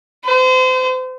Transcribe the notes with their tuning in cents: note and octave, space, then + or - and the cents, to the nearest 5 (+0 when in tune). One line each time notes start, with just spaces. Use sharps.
C5 -35